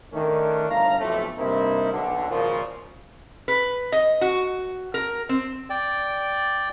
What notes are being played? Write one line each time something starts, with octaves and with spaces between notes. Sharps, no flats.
D#3 A3 C#4 D4
G1 A2 F5 A#5
B1 F2 A2 C3 A3
G2 C3 A#3 C4 D#4 E4
B1 D3
G#1 A#2 C#3 F3
B4
D#5
F#4
A#4
C4
D5 G5